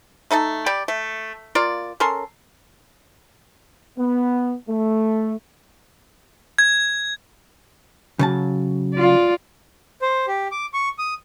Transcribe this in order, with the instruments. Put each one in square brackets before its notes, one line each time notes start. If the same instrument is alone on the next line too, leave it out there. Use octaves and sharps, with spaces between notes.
[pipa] A3 D#4 A4 A5
G3 G4 D5
A3
A#3 F4 D5
C#4 A4 A#4 C6
[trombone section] B3
A3
[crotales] G#6
[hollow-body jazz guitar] C#3 F#3 A5
[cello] F4 D5
[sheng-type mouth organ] C5
G4
D6
C#6
D#6